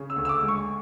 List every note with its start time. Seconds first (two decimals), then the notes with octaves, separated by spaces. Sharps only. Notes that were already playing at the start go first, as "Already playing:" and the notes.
Already playing: C#3
0.10 E6
0.16 D2
0.25 E6
0.29 D6
0.42 G#3
0.48 C#6